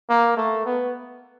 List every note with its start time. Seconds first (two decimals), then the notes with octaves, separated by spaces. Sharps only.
0.10 A#3
0.37 A3
0.66 B3